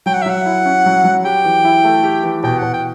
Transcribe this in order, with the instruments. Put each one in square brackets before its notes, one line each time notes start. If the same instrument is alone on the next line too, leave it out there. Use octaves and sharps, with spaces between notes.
[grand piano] F#3 [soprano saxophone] G5
[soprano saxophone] F#5
E5
[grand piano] F#3 [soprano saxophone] F#5
[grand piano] E4
C#4
F#3
F#3
[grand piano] G4 [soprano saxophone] G5
[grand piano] E3
E4
A3
G4
E3
[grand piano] B2 [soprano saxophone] G5
[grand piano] B2 [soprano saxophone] F#5
[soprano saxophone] G5